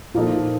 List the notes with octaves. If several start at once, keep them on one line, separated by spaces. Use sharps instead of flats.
A#2 F3 A#3 D#4 A4